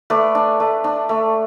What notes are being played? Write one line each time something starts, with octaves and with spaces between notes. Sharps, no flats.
A3 B4 D5
D4
A3
D4
A3